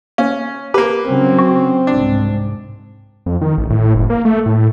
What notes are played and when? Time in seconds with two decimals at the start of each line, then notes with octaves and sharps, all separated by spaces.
0.18 A#3 C#4
0.74 A#3 G4 B4
1.06 C#3 F#3 C4 C#4
1.39 F#4
1.87 C2 G#2 D4
3.26 F2
3.41 D#3
3.58 A1
3.70 A2
3.95 F#1
4.10 A#3
4.25 A3
4.46 A2